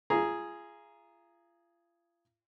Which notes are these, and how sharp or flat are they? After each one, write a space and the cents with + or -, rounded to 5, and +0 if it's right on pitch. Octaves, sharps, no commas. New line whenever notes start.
F4 -35 G#4 +0 A#5 +10